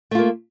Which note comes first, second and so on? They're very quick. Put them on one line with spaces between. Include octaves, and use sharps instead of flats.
A3 F4 A#3